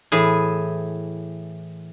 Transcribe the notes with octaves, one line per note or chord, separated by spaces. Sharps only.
A2 E3 G#4